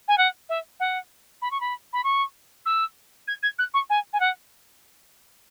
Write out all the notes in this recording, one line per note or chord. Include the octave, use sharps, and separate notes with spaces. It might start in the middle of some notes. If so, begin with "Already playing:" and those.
G#5
F#5
E5
F#5
B5
C#6
B5
B5
C#6
E6
G#6
G#6
F#6
C#6
G#5
G#5
F#5